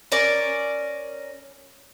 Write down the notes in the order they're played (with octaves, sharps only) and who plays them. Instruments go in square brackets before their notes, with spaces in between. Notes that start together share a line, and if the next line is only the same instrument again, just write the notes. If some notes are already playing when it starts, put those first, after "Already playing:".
[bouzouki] C#4 A#4 D5